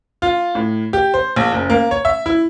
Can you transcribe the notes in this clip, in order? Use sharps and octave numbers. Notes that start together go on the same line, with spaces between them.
F4
A2
G4
C5
A#1
F#1
A#3
C#5
E5
E4